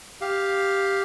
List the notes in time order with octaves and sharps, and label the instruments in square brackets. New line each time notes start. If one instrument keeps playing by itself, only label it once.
[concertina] G4 F5